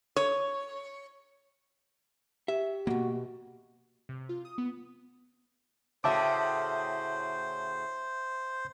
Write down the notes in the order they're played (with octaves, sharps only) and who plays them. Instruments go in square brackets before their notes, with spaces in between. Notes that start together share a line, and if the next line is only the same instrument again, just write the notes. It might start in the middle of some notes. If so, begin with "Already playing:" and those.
[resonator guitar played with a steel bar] C#5
[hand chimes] G4 [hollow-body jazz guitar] E5
[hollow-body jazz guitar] D2 B2 [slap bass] A#3 [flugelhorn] F#4
[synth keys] C3
F4
D#6
B3
[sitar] A2 C#3 F#4 [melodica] C5 [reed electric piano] E5 A5 D6